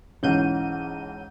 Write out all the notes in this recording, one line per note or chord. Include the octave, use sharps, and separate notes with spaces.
B1 G#2 E3 C#4 F5 F#5 G6 D#7